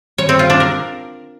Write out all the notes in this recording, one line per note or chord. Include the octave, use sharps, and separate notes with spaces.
C#5
C4
F4
D4
A#4